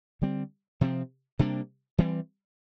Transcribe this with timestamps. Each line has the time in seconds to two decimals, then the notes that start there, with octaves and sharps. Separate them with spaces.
0.22 D3 G3 C4
0.81 C3 F3 C4
1.39 C3 G3 A#3 D4
1.98 E3 G3 C4